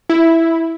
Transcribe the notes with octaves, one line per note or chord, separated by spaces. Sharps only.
E4